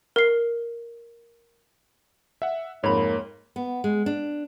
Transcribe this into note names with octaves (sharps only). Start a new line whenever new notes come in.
A#4 C7
E5 F#5
F2 G#2 A#3 C#5 B5
B3
G#3
D4